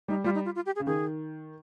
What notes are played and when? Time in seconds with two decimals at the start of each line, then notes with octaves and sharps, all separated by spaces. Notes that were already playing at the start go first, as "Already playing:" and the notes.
0.08 G3 D#4
0.24 G3 F4
0.35 D#4
0.45 F4
0.55 F4
0.66 G4
0.76 G#4
0.80 C#3
0.87 D#3 G#4